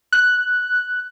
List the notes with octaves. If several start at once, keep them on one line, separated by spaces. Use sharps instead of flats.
F#6